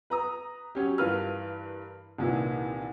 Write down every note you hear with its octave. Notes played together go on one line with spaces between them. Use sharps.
B4 A#5 D#6
F#3 C#4 G4
G2 E3 F4 A#4 B4 F6
C2 A#2 D#3 E3